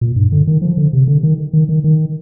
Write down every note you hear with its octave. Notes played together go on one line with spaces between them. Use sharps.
A#2
G2
D3
D#3
F3
D3
C3
D3
D#3
D#3
D#3
D#3